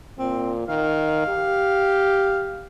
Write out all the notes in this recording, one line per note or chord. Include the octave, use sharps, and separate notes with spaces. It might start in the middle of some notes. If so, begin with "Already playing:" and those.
A#2 C4
D#3 F5
G4